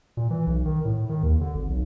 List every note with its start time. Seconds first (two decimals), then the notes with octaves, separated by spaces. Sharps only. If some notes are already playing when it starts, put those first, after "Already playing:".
0.17 A#2
0.30 E3
0.47 B1
0.65 D#3
0.85 A2
1.09 D#3
1.23 D#2
1.41 D3
1.55 G#1
1.69 B1